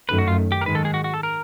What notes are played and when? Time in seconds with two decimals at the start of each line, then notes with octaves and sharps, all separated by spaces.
0.09 F#2 D#3 F#3 A3 B4
0.18 F#4
0.28 F4
0.52 G4
0.61 A#4
0.66 G#2 D#3 G#3 B4
0.75 A4
0.85 G#4
0.94 F#4
1.04 F#4
1.14 A4
1.23 A#4